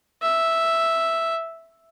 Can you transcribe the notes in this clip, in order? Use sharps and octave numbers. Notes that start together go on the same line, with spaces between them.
E5